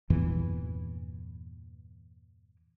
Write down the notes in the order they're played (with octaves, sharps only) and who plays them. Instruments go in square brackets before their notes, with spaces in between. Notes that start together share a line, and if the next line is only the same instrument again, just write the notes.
[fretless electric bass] E2 G2 A#2 E3